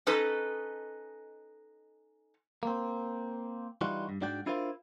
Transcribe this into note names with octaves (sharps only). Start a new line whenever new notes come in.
C#4 D#4 A4 B4 D#5
A#3 C4
E3 G3 D#4 F4 F#4
G2
G#2 D4 F#4 D5 G5
D4 E4 F4 A#4 C5 F5